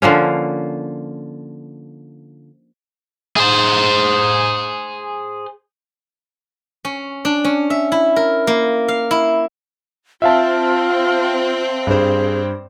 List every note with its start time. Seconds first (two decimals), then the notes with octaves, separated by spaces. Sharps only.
0.02 D3 F3 A#3 C#4
3.36 G#4 C5
6.85 C#4
7.25 D4
7.45 C#4
7.70 E5
7.92 E4
8.16 A#4
8.47 A#3
8.88 F5
9.11 E4
10.22 C4 F4 E5 F5 A5
11.87 G2 G#4 C5